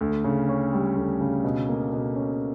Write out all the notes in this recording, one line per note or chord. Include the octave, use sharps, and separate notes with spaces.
D2
C#3
C#4
G3
D2
C#3
B2
A#3
B2
C#4